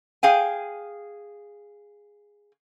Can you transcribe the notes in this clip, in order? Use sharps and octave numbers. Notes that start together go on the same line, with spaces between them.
G#4 F5 G5 G#5